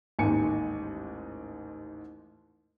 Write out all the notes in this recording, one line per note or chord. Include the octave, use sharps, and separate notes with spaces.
A1 D#2 G#2 G#5 C#7